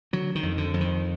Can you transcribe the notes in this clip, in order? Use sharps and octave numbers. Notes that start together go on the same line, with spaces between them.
D3 F#3
D#3
F2
D3
F2
D#3